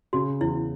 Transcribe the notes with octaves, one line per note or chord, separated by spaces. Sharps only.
C#3 F#4
E2 E4